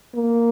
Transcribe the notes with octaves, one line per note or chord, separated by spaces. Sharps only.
A#3